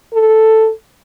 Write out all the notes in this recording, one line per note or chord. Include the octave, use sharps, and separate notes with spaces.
A4